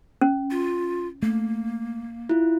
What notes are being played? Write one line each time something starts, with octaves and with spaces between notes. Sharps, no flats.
C#4
F4
A3 A#3
E4 F4